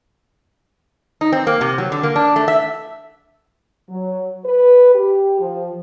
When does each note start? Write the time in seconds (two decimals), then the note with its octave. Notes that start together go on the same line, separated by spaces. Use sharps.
1.21 D#4
1.32 C4
1.47 A#3
1.61 C3
1.78 F#3
1.92 D3
2.03 A#3
2.16 D4
2.36 A3
2.48 E5
3.90 F#3
4.44 B4
4.95 G4
5.40 F3